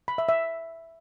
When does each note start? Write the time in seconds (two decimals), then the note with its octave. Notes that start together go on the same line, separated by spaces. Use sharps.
0.08 B5
0.18 E5
0.29 E5